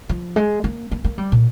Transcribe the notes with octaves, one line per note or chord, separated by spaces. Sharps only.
F3
G#3
A#3
A#3
A#3
G3
A#2